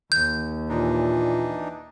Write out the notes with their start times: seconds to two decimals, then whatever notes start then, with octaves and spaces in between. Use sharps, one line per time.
0.12 D#2 G6
0.69 A#2 E3 D4 D#4